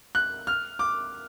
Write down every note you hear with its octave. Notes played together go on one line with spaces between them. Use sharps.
F#6
F6
D6